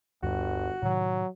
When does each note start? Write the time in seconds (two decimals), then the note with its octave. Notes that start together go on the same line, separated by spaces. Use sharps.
0.23 G1 D2 G2 F#4
0.82 A2 C3 D#3 F#3